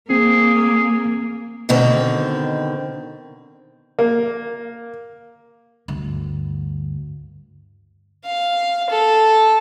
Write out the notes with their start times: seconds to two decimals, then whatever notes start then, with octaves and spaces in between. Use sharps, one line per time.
0.10 A#3 C4 G#4
1.69 B2 D3 D#3 C4
3.99 A#3
5.88 D2 G2
8.25 F5
8.90 A4